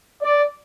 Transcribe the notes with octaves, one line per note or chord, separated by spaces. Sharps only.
D5